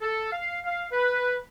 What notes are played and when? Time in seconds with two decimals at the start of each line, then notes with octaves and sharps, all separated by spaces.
0.02 A4
0.32 F5
0.65 F5
0.92 B4